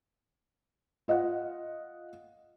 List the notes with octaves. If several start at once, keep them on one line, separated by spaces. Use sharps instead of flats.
F4 D#5 F5 F#5